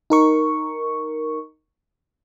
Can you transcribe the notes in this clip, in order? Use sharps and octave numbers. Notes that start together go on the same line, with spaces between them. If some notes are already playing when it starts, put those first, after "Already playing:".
D#4 A#4 C#6